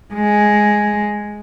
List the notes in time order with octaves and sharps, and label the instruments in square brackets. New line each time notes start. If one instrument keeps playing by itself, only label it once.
[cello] G#3